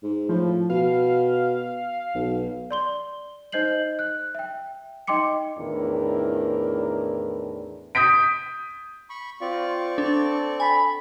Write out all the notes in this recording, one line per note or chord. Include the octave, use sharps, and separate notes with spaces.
G#2
A2 F3
B2 F5
B1
D5 C6 G7
D#4 C5 D#5 G6 C7 F#7
F#6
E5 G5
D#4 D#5 G5 C6 D6 C#7
E2 A2 D#3 D4 E4 A#4
D#6 G6 B6 D7
B5 C#6
C4 F4 D5 C#6
D4 A4
G#5 B5